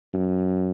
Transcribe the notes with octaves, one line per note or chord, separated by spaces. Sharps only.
F#2